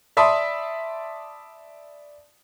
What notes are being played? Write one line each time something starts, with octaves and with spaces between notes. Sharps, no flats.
D5 E5 A5 B5 C6 D#6